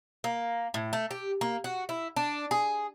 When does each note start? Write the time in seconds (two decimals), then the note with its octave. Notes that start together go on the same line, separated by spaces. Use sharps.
0.24 A#3
0.74 A2
0.93 A3
1.11 G4
1.41 A#3
1.64 F#4
1.89 E4
2.16 D4
2.51 G#4